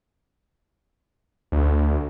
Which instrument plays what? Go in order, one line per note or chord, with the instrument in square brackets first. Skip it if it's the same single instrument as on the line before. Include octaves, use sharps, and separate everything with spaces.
[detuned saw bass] D2